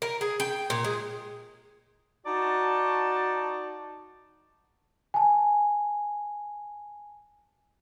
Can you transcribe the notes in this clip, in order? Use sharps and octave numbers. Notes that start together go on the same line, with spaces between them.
A#4
G#4
G5
A#2
G#3
D#4 F#4 D5 A5
G#5 A5